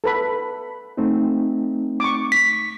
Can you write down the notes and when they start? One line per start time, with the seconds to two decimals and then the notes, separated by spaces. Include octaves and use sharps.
0.04 A4 B4 B5
0.97 A3 C4 D#4
2.00 C#6 D6
2.32 B6